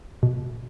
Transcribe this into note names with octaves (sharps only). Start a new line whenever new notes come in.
B2